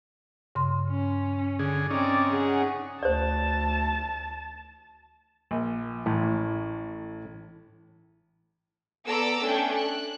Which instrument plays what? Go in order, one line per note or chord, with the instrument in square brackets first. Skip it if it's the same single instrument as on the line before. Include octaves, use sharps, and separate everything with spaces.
[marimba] G2 C#3 C6
[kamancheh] C#4
[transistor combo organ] D3 G#4
[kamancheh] C4 D5 [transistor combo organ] C#4 D#4
[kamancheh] G#4 F#5
[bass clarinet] D2 [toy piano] C5 D5 [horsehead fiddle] A5
[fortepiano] A#1
[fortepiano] A1 [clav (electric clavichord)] A2
[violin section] B3 A4 D5 A#5 D6 E6
A3 C#4 D4 A4 G5
F#6